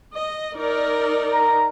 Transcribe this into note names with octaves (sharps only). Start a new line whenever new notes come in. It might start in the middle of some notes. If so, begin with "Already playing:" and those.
D#5
D#4 A#4 D5
A#5